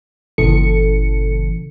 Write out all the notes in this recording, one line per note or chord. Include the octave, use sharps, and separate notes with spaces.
G1 A#2 C#3 E3 A4 C#7